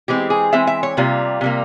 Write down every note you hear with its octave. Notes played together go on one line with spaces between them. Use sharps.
E3 G#3 C4 G4
G#4
E3 G#3 C4 E5
E5
C#5
C3 G3 A#3 F4
C3 G3 A#3